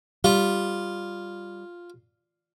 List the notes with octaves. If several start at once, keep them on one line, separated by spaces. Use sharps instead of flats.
G3 F4